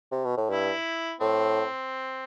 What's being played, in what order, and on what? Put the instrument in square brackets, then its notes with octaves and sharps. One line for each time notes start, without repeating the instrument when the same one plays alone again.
[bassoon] C3
B2
A2
[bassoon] G2 [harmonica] E4
[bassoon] A2 [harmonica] C4